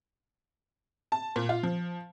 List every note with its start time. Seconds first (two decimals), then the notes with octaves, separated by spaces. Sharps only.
1.12 A5
1.36 A#2
1.49 F4
1.63 F3